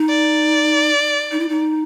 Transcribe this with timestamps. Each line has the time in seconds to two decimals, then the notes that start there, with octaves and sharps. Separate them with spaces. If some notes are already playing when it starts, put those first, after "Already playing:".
Already playing: D#4
0.09 D5
1.31 D#4
1.40 E4
1.49 D#4